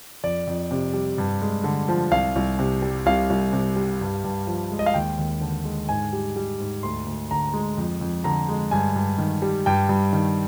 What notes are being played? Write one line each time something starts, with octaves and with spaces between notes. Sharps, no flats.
F2 D5
F2
C3
G3
G2
G#3
D3
F3
C2 F5
C2
C3
G3
C2 F5
C2
C3
G3
G2
G2
F3
G#3
D#5
F5
D#2 G5
D#2
D3
G#3
G#2 G#5
G3
G3
G#2
D2 C6
D2
D3 A#5
G#3
F2
F2
D3 A#5
G#3
G2 G#5
G2
D#3
G3
G2 G5
G2
D#3